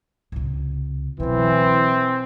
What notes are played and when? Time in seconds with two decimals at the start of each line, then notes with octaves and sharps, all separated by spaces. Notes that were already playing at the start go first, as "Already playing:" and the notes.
0.32 C#2 C3
1.20 B2 E3 F#3 C4